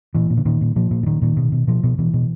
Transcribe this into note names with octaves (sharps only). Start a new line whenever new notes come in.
A#2 E3
A#2
D3
A#2 D#3
A#2
A#2 F3
A#2
E3
A#2 D#3
A#2 D#3
B2
B2
B2 F3
B2
B2 E3
B2